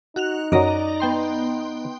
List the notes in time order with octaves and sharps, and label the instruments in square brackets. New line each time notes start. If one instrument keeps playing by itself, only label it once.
[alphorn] D#4 [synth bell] F#4 F#6 F7
[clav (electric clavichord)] F#2 F#3 [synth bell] D5 D#5 A#5
[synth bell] B3 G5 C6